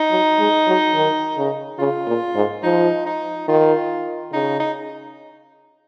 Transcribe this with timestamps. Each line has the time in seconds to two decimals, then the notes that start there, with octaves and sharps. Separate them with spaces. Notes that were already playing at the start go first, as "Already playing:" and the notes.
Already playing: D#4
0.11 F#3
0.39 G#3
0.67 F#3
0.94 D#3
1.37 C#3
1.79 C#3 F4
2.07 A#2
2.35 G#2
2.63 F3 D#4
3.06 D#4
3.48 D#3 F4
4.32 C#3 D#4
4.60 D#4